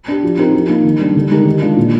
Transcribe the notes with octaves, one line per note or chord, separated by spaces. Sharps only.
D4 G4
F3
C4 D#4 G4 A#4
F3
A#3 D#4
D#3
G3 D4
D3
G#3 D#4 G4 A#4
D#3
G#3 D4 F4
A#2